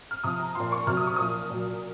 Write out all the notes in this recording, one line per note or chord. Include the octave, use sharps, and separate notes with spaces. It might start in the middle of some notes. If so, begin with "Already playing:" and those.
F6
C3 F3 D#6
A#5
A#2 F3 C6
C#6
C3 F#3 F6
D#6
C#6
A#2 F3 D#6
A#2 F#3